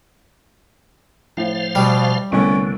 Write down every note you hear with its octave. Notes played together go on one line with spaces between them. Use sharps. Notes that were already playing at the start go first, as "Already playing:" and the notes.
A2 F3 C5 F5
B2 G3
C2 D3 A3 B3 C#4